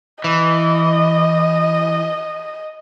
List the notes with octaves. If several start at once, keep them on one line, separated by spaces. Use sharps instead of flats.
E3 D#5